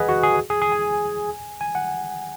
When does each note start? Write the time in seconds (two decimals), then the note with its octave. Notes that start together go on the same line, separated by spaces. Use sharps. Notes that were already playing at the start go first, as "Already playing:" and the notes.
Already playing: G#4 B4 D#5 F#5 G#5
0.09 F#4
0.23 G#4
0.50 G#4
0.62 G#4
0.72 G#5
1.61 G#5
1.75 F#5